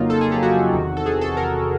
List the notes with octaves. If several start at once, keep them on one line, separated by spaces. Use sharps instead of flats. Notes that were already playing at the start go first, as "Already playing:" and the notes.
Already playing: F2 C#3 F#3 A#3 D#4 F4
A4
G#4
G4
F#4
E2 C3 D#3
A4
G#4
A4
A#4